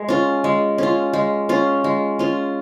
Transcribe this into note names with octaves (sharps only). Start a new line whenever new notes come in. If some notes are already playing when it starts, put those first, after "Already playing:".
Already playing: G#3
C#4 F4
G#3
C#4 F4
G#3
C#4 F4
G#3
C#4 F4